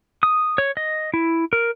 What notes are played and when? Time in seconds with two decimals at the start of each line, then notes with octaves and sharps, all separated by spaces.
0.23 D#6
0.58 C#5
0.77 D#5
1.14 E4
1.53 A#4